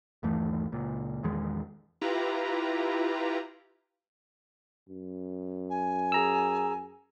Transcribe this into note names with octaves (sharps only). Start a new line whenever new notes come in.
G1 D#2 E3 A3
C#2 A#2
A#1 E2 D#3 G#3
E4 F4 G4 B4 A#5
F#2
G#5
G#4 A#5 E6